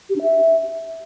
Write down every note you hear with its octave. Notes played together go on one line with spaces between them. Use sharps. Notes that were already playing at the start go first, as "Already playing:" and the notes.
G4
D4
E5